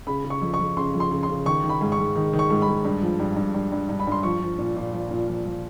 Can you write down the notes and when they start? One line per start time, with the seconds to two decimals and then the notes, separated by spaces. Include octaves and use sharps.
0.07 C#3 B5
0.24 C#3
0.30 C#6
0.41 F2
0.54 C#6
0.59 F2
0.77 C#3 C6
0.94 F2
1.00 C6
1.11 C#3
1.23 C6
1.29 C#3
1.46 D#3 C#6
1.63 D#3
1.69 B5
1.81 G#2
1.92 C#6
1.99 G#2
2.16 D#3
2.33 D#3
2.39 C#6
2.50 G#2
2.62 B5
2.67 G#2
2.85 G2
3.02 F3
3.20 G2
3.37 G2
3.54 G2
3.72 G2
3.89 G2
3.99 B5
4.07 G2 C6
4.23 F3 C#6
4.41 F3
4.59 A#2
4.77 A#2
4.93 F3
5.11 A#2
5.28 F3
5.45 F3